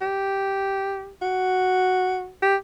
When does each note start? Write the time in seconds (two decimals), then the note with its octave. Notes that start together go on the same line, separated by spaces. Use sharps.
0.01 G4
1.21 F#4
2.42 G4